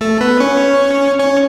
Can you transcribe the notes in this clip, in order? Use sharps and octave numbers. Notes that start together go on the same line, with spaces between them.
A3 A4
B3 B4
C#4 C#5
C#4 C#5